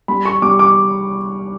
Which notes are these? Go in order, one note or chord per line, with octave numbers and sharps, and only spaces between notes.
G3 B5
C#6
G3 D6
D6